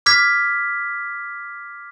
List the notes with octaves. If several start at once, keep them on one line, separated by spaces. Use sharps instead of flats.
D6 F6 G#6 B6